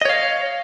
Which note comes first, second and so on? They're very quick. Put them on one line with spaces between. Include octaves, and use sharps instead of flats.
D#5 C#5 F5